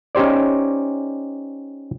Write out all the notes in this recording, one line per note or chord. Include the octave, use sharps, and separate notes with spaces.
C#4 D#4 G4 C5 D5